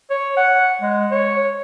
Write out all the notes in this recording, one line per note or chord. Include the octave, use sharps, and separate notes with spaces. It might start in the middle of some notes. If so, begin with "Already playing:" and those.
C#5
F#5
G#3
C#5